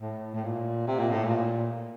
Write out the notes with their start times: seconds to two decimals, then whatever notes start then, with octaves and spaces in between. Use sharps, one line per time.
0.01 A2
0.35 A2
0.44 A#2
0.87 C3
1.00 A#2
1.11 A2
1.24 A#2